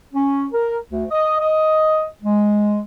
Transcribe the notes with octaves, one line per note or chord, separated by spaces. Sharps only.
C#4
A#4
D2
D#5
D#5
G#3